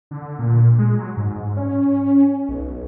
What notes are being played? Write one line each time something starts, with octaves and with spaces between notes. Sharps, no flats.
D3
A#2
G#3
F#3
G#2
C#4
B1